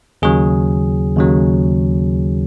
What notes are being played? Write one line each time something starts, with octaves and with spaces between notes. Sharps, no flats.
D#2 C#3 F#3 G#4
D#2 C#3 F#3